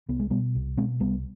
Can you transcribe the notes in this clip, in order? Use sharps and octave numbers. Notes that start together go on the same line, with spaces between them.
C2 B3
G#3
B2 G3 B3
C2
B2 G#3 C4
C2 G3 B3